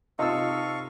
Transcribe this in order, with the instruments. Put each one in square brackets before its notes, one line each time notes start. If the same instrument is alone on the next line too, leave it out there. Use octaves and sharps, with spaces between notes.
[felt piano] C3 F4 A5 [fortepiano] D#4 E6 [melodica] A4 F5 C#6